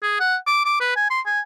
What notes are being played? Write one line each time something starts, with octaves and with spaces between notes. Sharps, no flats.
G#4
F#5
D6
D6
B4
G#5
C6
G#5